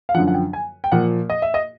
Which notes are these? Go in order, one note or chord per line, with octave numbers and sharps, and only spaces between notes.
F5
F#2 D3 F3 F#5
F#5
G5
G#5
G5
A#2 F3 F#5
D#5
E5
D#5